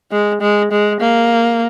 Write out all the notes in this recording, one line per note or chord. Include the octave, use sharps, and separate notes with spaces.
G#3
G#3
G#3
A#3